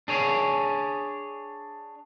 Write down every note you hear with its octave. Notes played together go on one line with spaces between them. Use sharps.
D4 G#4 C#5